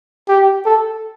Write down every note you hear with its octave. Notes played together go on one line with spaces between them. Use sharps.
G4
A4